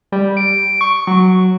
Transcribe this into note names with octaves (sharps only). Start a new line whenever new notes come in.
G3
D7
C#6
F#3